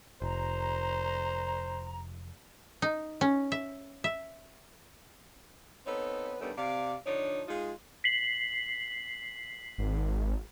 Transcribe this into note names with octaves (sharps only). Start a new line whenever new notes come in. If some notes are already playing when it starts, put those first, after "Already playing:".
F1 C5 A#5
D#4
C#4
E5
E5
B3 C4 D#4 A4 B4 C#5
G2 D#3 G3 A3 B3 C#4
C3 D5 F5
D3 F3 D4 D#4 C#5
G#3 D#4 F4
B6 C7 F#7
G#1